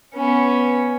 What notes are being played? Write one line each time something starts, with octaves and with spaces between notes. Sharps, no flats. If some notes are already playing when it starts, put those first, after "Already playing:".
B3 C#4